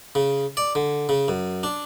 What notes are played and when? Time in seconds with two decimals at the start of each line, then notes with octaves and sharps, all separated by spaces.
0.15 C#3
0.57 D5
0.75 D3
1.09 C#3
1.28 F#2
1.63 D4